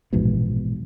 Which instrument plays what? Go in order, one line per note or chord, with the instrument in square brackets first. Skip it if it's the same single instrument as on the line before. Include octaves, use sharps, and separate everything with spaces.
[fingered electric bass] A#1 E2 G#2 B2